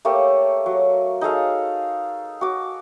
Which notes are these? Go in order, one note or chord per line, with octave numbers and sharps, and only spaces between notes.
A3 A#3 G4 C#5
F#3
D#4 G#4 A4 F5
F#4 D6